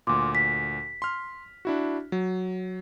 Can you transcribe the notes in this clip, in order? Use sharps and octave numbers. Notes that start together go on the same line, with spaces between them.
D2 A#2 C6 D6
B6
C6 F6
D4 E4 F#4
F#3